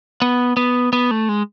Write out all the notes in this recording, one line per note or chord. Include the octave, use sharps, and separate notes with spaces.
B3
B3
B3
A3
G#3